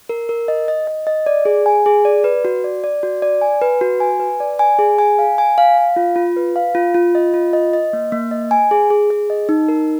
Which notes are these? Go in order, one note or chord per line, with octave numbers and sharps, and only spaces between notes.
A#4
A#4
D#5
D#5
D#5
D#5
D5
G#4
G#5
G#4
D5
B4
F#4
D5
D5
F#4
D5
G#5
B4
F#4
G#5
B4
D5
G#5
G#4
G#5
F5
G#5
F5
F5
F4
F4
B4
F5
F4
F4
D#5
F4
D#5
D#5
A#3
A#3
D#5
G#5
G#4
G#4
G#4
D#5
D#4
A#4